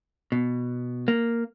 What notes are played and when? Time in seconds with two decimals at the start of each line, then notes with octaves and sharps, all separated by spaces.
0.32 B2
1.08 A#3